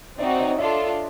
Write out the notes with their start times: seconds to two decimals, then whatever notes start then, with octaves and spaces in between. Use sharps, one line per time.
0.18 C4 D#4 F#4 D5 E5
0.38 C#5 D#5
0.58 D4 F4 A4 D5 E5